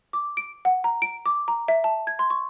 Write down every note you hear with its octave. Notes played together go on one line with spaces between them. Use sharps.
D6
D7
F#5
A#5
D7
D6
A#5
E5
A5
G#6
C6
C#6